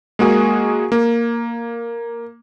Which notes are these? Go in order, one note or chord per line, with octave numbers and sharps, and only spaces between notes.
G#3 A#3 F#4 G#4
A#3